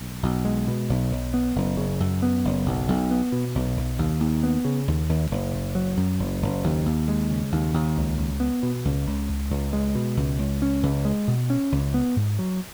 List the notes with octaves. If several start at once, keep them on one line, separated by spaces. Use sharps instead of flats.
B1
B1
G#3
B2
B1
B1
B3
F#1
C#3
F#2
B3
F#1
B1
B1
B3
B2
B1
B1
D#2
D#2
B3
C#3
D#2
D#2
F#1
F#1
F#3
F#2
F#1
F#1
D#2
D#2
G#3
C#3
D#2
D#2
C#2
C#2
B3
B2
C#2
C#2
C#2
C#2
G#3
B2
C#2
C#2
C#4
C#2
G#3
B2
C#4
C#2
B3
G#2
F#3